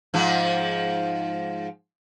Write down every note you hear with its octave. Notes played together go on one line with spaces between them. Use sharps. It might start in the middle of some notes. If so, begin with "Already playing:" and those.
G#2 F3